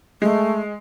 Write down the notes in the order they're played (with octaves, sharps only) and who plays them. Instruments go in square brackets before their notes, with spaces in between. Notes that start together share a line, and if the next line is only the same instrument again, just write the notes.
[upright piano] G#3 [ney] A3